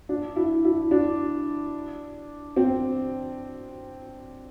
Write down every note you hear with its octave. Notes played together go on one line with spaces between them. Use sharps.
D4
E4
E4
D4
C4